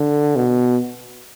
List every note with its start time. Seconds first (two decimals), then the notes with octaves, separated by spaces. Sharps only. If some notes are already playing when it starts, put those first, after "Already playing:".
Already playing: D3
0.36 B2